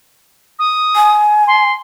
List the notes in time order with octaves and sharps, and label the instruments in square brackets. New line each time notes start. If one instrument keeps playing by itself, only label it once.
[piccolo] D#6
[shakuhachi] G#5
[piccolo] C6